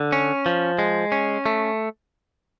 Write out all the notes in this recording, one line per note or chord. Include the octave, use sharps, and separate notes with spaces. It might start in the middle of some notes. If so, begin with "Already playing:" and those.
Already playing: D3
C#4
F3
G#3
C#4
A3